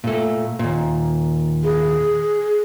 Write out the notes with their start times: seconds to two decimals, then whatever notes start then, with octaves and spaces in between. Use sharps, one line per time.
0.04 A#2 A3
0.59 D#2 A#2
1.64 G#4